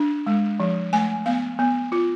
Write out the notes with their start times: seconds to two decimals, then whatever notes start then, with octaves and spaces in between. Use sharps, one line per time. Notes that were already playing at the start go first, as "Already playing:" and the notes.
Already playing: D4
0.27 G#3
0.60 F3
0.93 A3 G#5
1.26 B3 F5
1.59 B3
1.92 F4